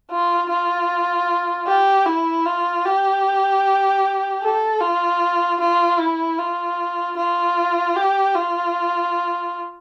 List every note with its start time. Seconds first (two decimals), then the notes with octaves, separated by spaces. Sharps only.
0.11 F4
0.50 F4
1.67 G4
2.06 E4
2.45 F4
2.85 G4
4.43 A4
4.81 F4
5.60 F4
5.99 E4
6.39 F4
7.17 F4
7.96 G4
8.35 F4